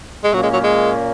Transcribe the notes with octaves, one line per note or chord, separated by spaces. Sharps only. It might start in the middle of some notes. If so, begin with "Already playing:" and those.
G#3
A#2 F#3 A#3 C#4
G#3
F#3
G#3